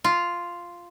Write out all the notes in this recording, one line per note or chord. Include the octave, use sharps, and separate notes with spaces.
F4